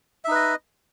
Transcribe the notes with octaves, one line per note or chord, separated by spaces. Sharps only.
D#4 B4 D#5 E5